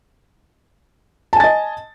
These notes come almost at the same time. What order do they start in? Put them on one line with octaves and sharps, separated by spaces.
A5 G#5 A6 D#5